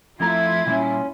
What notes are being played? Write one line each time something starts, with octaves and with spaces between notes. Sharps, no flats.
F2 A3 E4 F4 A#5 G#6
A#2 G3 C#4